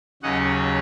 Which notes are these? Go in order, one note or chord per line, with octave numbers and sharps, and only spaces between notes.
D#2 C#3 F#3 C#4 D#5 F#5